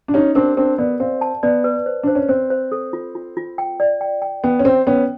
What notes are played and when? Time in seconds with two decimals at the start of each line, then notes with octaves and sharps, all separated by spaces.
0.08 D4
0.14 C#4 D#4 G4
0.35 C4 D4 A#4
0.57 C4 D4 A#4
0.78 B3 D5
1.00 C4 F5
1.21 A5
1.43 B3 D5
1.64 B4
1.86 C5
2.03 D4 C5
2.15 C#4
2.29 C4 C5
2.50 C5
2.72 A4
2.93 F4
3.15 F4
3.37 F4
3.58 G5
3.80 D5
4.01 G5
4.22 G5
4.44 B3 G5
4.59 C#4
4.65 C4 G5
4.87 B3 C#4 G5